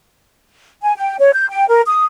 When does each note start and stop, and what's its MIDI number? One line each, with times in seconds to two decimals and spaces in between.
0.82 0.96 80
0.96 1.16 79
1.20 1.31 73
1.34 1.49 91
1.49 1.67 79
1.68 1.82 70
1.87 2.05 87